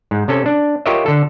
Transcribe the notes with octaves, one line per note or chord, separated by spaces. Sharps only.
G#2
C3 C#4 A4
D4
F4 G4 A#4 C#5 D#5 E5
D3 A4